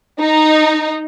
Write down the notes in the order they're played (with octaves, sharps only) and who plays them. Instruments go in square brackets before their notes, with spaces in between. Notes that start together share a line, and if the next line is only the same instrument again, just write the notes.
[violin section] D#4